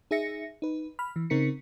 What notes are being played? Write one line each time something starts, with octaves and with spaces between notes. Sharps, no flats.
D#4 G#4 E5 A#6 C#7
D#4 B4
B5 F6
E3
C#3 C4 D#4 A#4 B6 C#7